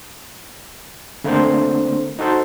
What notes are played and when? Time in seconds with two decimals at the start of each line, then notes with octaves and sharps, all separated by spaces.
1.24 D3 A3 A#3 C4 D4 C5
2.19 D#4 F#4 A4 C5